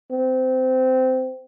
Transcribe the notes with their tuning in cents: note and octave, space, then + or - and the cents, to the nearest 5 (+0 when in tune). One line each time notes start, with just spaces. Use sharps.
C4 -20